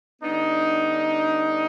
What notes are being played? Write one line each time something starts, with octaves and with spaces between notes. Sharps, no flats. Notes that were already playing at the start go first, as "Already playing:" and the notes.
D3 G3 B3 D4 D#4